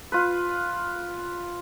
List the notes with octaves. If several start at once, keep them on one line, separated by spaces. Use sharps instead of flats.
F4 B4